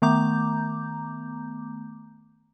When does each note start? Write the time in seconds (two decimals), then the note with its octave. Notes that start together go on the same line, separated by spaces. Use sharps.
0.02 D#3 A3 B3 A#5 D6 G6